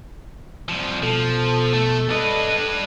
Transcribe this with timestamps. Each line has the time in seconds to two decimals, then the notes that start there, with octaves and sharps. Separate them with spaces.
0.69 C2 F3
1.03 B2 F3 A4
1.73 A3
2.11 D4 A4 B4 D#5